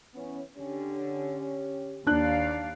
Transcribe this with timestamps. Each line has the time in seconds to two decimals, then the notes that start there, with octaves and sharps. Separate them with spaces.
0.14 E3 B3 C#4
0.57 D3 C#4 G4
2.07 D#2 D4 D5 F5 F#6